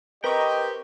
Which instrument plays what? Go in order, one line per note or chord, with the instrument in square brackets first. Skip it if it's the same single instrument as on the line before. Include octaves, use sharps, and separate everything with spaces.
[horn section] C4 G4 [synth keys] A#4 B4 A#5 [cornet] D#5 [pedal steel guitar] G5 C#6